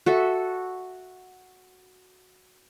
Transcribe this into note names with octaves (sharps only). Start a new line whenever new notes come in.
F#4 A4 E5